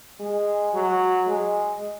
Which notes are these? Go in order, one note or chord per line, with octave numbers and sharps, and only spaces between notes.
G#3
F#3
G#3